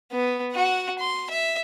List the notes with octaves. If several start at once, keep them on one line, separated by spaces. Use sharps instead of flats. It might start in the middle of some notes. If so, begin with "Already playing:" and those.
B3
F#4 F#5
C6
E5